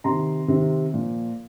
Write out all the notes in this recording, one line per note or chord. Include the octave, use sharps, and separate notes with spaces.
C3 D#3 A#5 C6
C3 D#3
A#2 F3